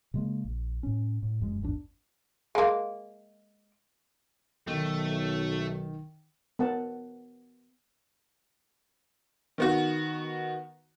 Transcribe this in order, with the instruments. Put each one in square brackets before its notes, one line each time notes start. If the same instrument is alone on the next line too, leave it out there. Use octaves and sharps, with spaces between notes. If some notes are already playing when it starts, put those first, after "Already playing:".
[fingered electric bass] C#3 G#3 A#3
A#1
A2 C#4
A2
F1 F#2 G#3
G#1 E2 D4
[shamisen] G#3 A#3
[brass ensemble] B1 [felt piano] D#3 [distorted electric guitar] A3
[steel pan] B3 A#4 F#5 A5
[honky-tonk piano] D#3 B3 F#4